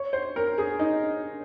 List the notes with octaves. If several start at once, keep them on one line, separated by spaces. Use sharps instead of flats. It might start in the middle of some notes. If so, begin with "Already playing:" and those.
Already playing: C#5
C5
A#4
G#4
D#4